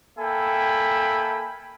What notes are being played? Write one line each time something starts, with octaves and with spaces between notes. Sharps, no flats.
A#3 A4 E5 G5 G#5 B5